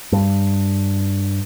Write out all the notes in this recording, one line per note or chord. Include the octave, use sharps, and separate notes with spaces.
G2